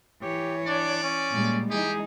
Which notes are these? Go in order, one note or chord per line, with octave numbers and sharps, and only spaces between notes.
E3 G4 C#5
D4 D5
C#4
A#2 G3 G#3
E3 G#3 D#4 G4 G#4